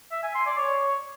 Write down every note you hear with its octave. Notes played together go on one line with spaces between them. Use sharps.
E5
G#5
C6
D5
C#5